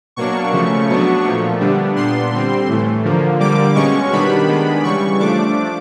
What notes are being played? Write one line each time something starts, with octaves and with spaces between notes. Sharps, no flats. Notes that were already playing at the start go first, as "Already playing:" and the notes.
B2 F#3 A#3 D4 C#6
C#3 F3 A3
B2 F#3 B3 D4
A#2 F3 A3
D3 G3 B3 D4
A#2 G3 B3 D4 C6
D3 G3 C4
A2 E3 A3
D3 F3 A#3
D3 G3 A#3 D6
B2 G#3 C#4 C#6
D#3 G3 B3 D4 B5
D#3 G#3 B3 D4
C#3 E3 G3 C#6
F3 A3 D4 D6